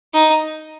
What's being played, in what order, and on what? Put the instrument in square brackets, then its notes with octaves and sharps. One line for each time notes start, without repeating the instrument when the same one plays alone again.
[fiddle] D#4